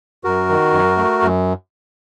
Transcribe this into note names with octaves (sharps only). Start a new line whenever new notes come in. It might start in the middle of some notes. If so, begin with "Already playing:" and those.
F#2 F#4 A#4
D#3
F#2
A3
F#2